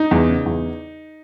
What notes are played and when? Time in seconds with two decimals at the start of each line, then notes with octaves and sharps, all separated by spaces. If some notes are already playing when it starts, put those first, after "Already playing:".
Already playing: D#4
0.11 E2
0.29 C#3
0.46 E2